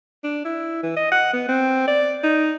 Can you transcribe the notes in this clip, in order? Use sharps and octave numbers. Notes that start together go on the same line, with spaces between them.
D4
E4
E3
D#5
F#5
B3
C4
D5
D#4